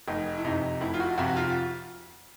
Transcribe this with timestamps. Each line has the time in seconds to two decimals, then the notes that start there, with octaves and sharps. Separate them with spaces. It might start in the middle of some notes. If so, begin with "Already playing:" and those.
0.08 F1 D#4
0.38 E4
0.45 F2 C3 D#4
0.81 F1 E4
0.94 F4
1.00 F#4
1.18 F2 C3 F#4
1.28 F#4
1.36 F4